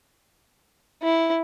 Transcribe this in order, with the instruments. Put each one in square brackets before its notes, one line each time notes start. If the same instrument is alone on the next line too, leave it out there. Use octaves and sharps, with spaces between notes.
[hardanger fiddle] E4